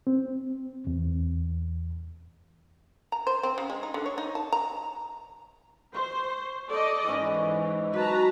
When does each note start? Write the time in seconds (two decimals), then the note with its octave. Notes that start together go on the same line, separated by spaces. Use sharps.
0.07 C4
0.87 E2
3.12 A#5
3.27 C5
3.43 C4
3.58 C#3
3.70 G#3
3.83 D#4
3.94 D3
4.06 C#5
4.18 D#4
4.35 A5
4.52 A#5
5.94 C5 C#6
6.68 A4 D5 D#5
7.08 G#2 E3 C#4 C#6
7.93 F#3 B4 A5 A#5